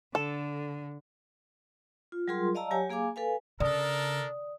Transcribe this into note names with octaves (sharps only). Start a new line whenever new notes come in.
D3 A4
F4
F#3 G3 F4 G#4 A#4 C6
D5 D#5 F5 A5 A#5 E6
F#3 G4 C#5 G#5
A#3 G#4 F5 G#5 D6
A4 B4 F5 G#5
C#3 D4 A4 A#4 D5 D#6